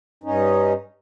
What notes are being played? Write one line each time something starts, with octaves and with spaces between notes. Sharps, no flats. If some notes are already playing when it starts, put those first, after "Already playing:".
G2 C#4 D#4